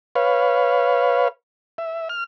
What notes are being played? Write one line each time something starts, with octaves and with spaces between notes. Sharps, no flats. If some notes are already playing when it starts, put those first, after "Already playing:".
B4 C#5 F5
E5
F6